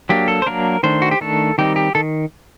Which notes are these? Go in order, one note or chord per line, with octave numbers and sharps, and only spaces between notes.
F#3 A#3 D4 G4
A4
C5
F#3 A#3 D4 A#4
D#3 A3 D4 C5
F#4
G4
D#3 A3 D4 A4
D#3 G3 C4 D#4 G4
G4
D#3 A4